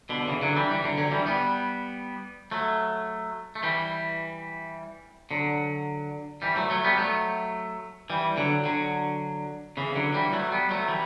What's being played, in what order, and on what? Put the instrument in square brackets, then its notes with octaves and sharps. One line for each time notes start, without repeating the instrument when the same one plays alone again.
[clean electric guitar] B2 D3
D3
C#3 E3
D3 F#3
E3 G3
E3 G3
D3 F#3
D3 F#3
E3 G3
G3 B3
F#3 A3
A3
E3 G3
D3 F#3
E3 G3
F#3 A3
F#3 A3
G3 B3
F#3 A3
E3 G3
D3 F#3
D3 F#3
C#3 E3
D3 F#3
E3 G3
F#3 A3
G3 B3
F#3 A3
E3 G3